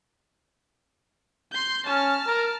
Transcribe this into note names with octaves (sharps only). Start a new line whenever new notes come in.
C6 G6
C#4 A5 F6
A#4